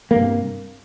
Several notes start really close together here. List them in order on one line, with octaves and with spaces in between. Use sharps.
A#3 G2 C3